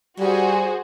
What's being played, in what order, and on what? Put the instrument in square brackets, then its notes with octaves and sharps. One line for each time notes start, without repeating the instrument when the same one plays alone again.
[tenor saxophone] G3 [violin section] F#4 G#4 C5